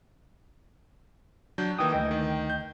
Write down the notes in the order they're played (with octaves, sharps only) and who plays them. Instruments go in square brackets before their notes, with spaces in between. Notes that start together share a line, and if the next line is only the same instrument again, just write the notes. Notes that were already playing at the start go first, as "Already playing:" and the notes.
[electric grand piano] F#3 D4 G6
[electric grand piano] D#3 E3 A#3 [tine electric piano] G5 D#6
[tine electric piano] D2 D#5 G5 [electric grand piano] E3
[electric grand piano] D#3
G6